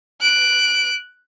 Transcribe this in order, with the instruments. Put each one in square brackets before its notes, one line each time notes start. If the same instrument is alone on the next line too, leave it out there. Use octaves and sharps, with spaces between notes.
[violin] F#6 D7